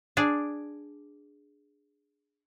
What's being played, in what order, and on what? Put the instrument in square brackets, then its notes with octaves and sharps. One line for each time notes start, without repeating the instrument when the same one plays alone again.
[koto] D4 G#4 D5